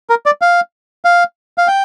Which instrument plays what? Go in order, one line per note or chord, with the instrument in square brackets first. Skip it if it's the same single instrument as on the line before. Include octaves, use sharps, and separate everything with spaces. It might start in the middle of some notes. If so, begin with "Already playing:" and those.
[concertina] A#4
D5
F5
F5
F5
G5